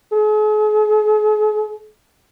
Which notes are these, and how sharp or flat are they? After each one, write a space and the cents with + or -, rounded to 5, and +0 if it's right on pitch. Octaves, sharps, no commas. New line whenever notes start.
G#4 +45